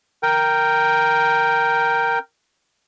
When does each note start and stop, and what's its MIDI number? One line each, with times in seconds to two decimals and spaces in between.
0.23 2.19 70
0.23 2.19 79